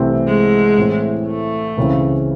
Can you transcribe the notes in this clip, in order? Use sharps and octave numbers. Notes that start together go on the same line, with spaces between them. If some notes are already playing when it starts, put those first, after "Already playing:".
Already playing: C2 C3 E3 A3 C4
G#3
A2 E3 C4
A3
C#2 C#3 E3 C4